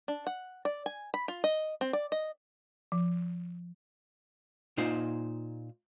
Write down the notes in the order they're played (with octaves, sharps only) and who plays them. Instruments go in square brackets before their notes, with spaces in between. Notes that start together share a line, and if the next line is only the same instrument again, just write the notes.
[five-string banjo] D4
F#5
D5
G#5
B5
F4
D#5
C4
D5
D#5
[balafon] F3
[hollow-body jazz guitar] A#2 D#4 C5